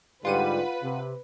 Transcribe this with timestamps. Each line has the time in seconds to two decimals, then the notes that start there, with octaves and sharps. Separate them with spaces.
0.25 G#2 D3 G3 F4 B4 F#5 D#7
0.83 C3